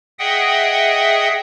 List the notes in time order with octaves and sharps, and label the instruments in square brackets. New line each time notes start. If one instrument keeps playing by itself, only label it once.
[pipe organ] G#4 D#5 E5 F#5 G5 D#6